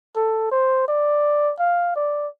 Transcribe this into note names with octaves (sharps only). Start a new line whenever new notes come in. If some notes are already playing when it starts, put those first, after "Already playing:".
A4
C5
D5
F5
D5